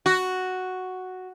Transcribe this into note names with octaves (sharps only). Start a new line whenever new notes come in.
F#4